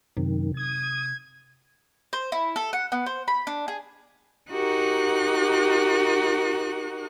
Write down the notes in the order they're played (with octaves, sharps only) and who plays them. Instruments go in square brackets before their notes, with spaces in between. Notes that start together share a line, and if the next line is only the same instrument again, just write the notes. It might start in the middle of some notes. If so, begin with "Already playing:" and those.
[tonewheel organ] F#2 D#3 [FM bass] C3
[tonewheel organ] D#6 [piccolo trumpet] G#6
[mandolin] C5
E4
A4
F#5
B3
C5
B5
D4
G#4
[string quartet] D#4 F#4 G4 A#4 F#6